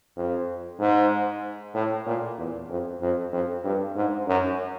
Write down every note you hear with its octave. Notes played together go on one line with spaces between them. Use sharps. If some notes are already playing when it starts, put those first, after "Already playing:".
F2
G#2
A2
A#2
E2
F2
F2
F2
G2
G#2
F#2